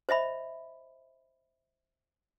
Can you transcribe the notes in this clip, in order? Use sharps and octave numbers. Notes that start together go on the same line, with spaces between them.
C5 D#5 E5 B5